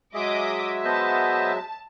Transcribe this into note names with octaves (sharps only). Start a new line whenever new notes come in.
F#3 G#3 G#4 D#5 E5 D6 D#6
B3 C5 D#5 A5